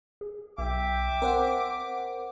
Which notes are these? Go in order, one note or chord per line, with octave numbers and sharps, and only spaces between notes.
G#4
B1 E5 G5 D6
C4 A#4 C5 F#5